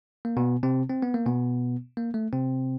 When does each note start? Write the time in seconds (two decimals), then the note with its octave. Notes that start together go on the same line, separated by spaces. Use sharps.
0.25 A#3
0.37 B2 B3
0.63 C3 C4
0.90 C4
1.03 B3
1.14 A#3
1.26 B2 B3
1.97 A#3
2.14 A3
2.33 C3 C4